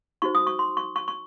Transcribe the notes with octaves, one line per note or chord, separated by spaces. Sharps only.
D#4 F#4 C5 C#6
D#6
C#6
C6
C#6
C#6
C#6